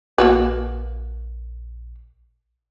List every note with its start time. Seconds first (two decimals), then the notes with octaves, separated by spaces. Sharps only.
0.18 A#1 A#3 F#4 B4